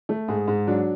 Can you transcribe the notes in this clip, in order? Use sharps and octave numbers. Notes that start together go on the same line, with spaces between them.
A3
G#2 G#4
G#2
F#3 D4